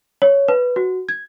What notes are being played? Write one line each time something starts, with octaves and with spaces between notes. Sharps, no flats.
C#5
B4
F#4
G#6